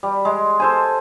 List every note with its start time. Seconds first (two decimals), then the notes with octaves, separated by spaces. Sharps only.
0.03 G3
0.25 G#3
0.60 A4 C5 G#5